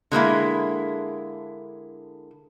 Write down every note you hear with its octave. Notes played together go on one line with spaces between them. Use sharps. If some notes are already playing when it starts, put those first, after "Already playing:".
D3 G#3 A#3 E4